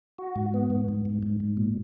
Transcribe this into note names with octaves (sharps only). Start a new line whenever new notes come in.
F#4
G#2
B3
G#2
G#2
G#2
G#2
G#2
A#2